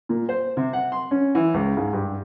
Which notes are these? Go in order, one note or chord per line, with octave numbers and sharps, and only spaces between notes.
A#2
C5
C3
F#5
C6
C#4
E3
C#2
G#2
G2